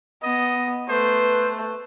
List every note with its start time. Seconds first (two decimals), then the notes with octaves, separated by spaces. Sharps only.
0.23 B3 D#5
0.89 A3 B4 C5